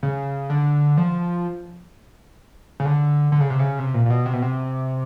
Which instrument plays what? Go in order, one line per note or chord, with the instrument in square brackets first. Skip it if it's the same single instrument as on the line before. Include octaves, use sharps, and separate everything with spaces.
[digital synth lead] C#3
D3
F3
C#3
D3
D3
C#3
C3
C#3
C3
A#2
A#2
B2
C3
B2
C3